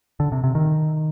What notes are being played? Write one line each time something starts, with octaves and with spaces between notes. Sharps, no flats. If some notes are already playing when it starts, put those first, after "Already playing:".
D3
C3
C3
D#3